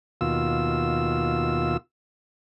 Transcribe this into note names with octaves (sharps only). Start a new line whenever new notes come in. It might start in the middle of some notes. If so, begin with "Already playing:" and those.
D#2 B2 F4 E6